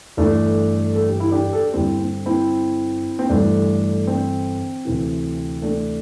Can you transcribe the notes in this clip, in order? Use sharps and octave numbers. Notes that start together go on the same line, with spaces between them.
G1 G2 E3 A3 D4
A4
G4
E4
D4 G4
A4
G4
G1 G2 D3 C4 E4
C4
C4 E4
C4
G1 G2 E3 A3 D4
C4
D2 C3 E3
A3 D4